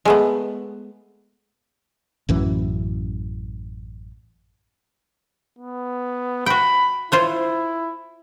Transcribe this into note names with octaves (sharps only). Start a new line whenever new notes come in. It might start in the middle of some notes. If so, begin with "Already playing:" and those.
G#3 A3 B3
A1 F#2 E3
B3
F#4 G5 B5
E4 F4 C5 C#5